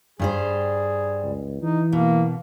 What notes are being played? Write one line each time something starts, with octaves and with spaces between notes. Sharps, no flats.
G2 G3 G#4 C5
C#2
E3 D#4
B2 A#3